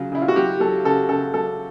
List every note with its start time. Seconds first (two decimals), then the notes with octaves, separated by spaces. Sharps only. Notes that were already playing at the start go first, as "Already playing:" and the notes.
Already playing: C#3 F#3 F4
0.12 C#3 E4
0.22 F4
0.28 F#4
0.36 F#3 G4
0.60 F#3 A4
0.85 C#3 A4
1.09 C#3 A4
1.34 F#3 A4